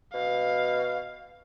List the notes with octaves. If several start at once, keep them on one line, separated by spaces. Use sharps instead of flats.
B2 F5